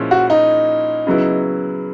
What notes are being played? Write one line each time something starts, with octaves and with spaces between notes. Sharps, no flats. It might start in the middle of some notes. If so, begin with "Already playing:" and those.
Already playing: A#2 F3 G#3 C#4 E4
F#4
D#4
C#3 F#3 B3 E4